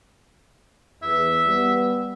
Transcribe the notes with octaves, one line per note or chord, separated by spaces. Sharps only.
E2 E5
G3 B3